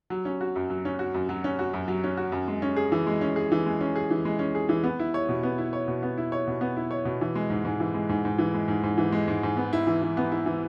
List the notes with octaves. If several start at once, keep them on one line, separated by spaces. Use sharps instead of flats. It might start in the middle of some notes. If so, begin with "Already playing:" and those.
F#3
C#4
F#4
F#2
F#3
C#4
F#4
F#2
F#3
C#4
F#4
F#2
F#3
C#4
F#4
F#2
G#3
C#4
G#4
E3
G#3
C#4
G#4
E3
G#3
C#4
G#4
E3
G#3
C#4
G#4
E3
B3
E4
C#5
B2
B3
E4
C#5
B2
B3
E4
C#5
B2
B3
E4
C#5
B2
E3
G#3
G#2
G#2
E3
G#3
G#2
G#2
E3
G#3
G#2
G#2
E3
G#3
G#2
G#2
B3
E4
E3
E3
B3
E4
E3